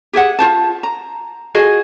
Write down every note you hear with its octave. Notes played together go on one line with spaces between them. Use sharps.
G4 G#4 E5 F#5
F4 C5 A5
A#5
F4 F#4 G#4 D#5